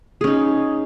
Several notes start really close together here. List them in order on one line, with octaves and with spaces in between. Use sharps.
G#4 C#4 D#4